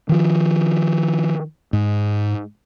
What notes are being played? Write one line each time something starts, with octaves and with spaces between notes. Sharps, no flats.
D#3 F3
G#2